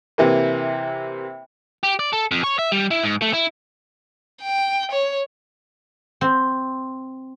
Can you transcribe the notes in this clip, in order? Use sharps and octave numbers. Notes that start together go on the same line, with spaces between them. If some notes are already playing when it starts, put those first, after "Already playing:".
C3 E3 A#3
G4
D5
A4
F2
C#5
E5
G3
E4
G#2
A3
E4
G5
C#5
C4